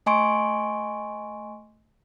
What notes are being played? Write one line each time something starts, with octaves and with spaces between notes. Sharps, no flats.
A3 D#5 G#5 C6 C#6 D7